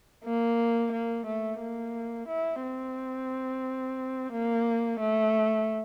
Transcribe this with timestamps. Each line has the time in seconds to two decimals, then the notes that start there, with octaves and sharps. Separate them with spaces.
0.24 A#3
0.92 A#3
1.26 A3
1.60 A#3
2.28 E4
2.62 C4
4.32 A#3
5.00 A3